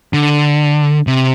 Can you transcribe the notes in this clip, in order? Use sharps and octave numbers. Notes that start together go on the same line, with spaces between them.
D3
C3